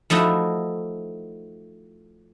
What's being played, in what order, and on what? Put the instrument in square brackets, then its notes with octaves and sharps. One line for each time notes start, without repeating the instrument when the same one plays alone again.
[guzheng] F3 A3 D#4 E4 F#4